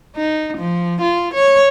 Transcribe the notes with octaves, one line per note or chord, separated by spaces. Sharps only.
D#4
F3
F4
C#5